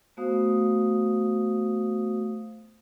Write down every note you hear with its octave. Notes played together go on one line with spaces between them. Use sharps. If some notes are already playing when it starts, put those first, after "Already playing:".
A3 B3 F#4 C5 F5 D#6